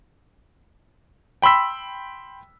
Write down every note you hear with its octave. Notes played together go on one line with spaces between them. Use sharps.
G5 B5 C6 E6 B6